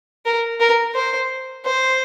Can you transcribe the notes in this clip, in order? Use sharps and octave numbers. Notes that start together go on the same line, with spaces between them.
A#4
A#4
C5
C5